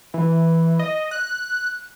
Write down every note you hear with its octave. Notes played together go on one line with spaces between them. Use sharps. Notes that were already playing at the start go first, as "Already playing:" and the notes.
E3
D#5
F#6